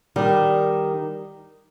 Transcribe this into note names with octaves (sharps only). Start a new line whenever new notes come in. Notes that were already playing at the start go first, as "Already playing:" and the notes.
D#3 G3